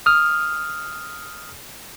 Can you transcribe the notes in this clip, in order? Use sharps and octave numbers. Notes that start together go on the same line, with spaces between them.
D#6 F6